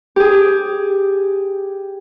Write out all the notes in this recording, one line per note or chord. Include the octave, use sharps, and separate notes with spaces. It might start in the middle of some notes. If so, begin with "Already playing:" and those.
G4 G#4